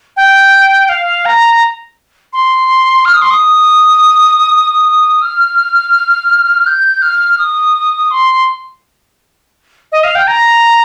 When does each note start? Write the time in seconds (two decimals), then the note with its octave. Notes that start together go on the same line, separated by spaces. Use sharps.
0.17 G5
0.89 F5
1.26 A#5
2.33 C6
3.05 F6
3.14 D#6
3.22 C6
3.31 D#6
5.22 F6
6.67 G6
7.02 F6
7.38 D#6
8.11 C6
9.92 D#5
10.04 F5
10.15 G5
10.28 A#5